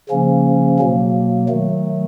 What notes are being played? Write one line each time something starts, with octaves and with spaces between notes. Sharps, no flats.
C#3 F3 A#3 C#4
B2 F#3 A#3
D#3 F#3 A3